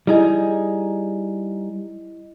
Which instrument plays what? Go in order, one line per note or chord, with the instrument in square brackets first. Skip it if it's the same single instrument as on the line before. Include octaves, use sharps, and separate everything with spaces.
[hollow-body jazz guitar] G3 D#4 G#4 [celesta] E4 D#5